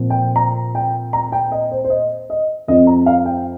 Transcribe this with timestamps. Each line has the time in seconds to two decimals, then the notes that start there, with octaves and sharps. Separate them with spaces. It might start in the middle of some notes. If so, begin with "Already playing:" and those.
Already playing: A#2 F3 C4
0.10 G5
0.36 A#5
0.75 G5
1.13 A#5
1.32 G5
1.52 D#5
1.71 C5
1.84 C5
1.90 D#5
2.30 D#5
2.68 F2 F3 C4 D#5
2.87 A#5
3.06 F5
3.26 G5